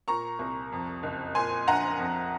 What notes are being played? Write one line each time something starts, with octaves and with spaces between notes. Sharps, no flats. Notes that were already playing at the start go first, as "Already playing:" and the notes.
A#2 A#5 C#6
C2
F2
F#1
A#2 G#5 C6
A#1 F#5 A#5
F2